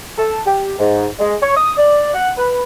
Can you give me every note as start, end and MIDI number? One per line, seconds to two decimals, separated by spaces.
0.18 0.40 69
0.46 0.74 67
0.79 1.07 44
1.19 1.34 56
1.42 1.54 73
1.56 1.73 87
1.77 2.14 74
2.14 2.30 78
2.37 2.63 71